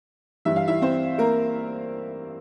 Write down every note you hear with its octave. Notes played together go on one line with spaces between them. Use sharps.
G2 E3 G3 E5
F5
E4 E5
C4 C5
A#3 A#4